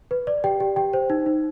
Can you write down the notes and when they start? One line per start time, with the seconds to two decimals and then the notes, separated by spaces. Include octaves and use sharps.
0.11 B4
0.27 D5
0.44 G4 G5
0.60 G4
0.76 G4 G5
0.93 C5
1.10 D#4
1.26 D#4